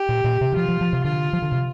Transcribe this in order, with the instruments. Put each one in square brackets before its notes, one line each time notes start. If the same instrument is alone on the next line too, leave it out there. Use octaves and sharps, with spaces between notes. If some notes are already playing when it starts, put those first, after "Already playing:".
Already playing: [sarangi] G4
[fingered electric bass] A#2
A#2
C3
D3
[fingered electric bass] F3 [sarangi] F4
[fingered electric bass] F3
F3
C3
[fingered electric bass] D3 [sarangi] F4
[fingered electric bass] F3
D3
C3